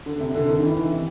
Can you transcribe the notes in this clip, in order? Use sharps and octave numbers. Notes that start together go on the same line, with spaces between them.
D3
C3
D3
D#3
E3
C3